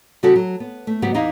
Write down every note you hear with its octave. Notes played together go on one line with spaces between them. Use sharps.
C#3 G3 E4 F#4 G4 A4
F#3
B3
A3
G#2 C#3 F#3 B3 G4 F#5
E2 D#4 E4 G4 D#5 F5